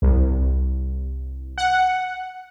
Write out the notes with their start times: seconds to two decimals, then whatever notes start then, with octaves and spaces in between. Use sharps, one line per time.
0.02 C2
1.58 F#5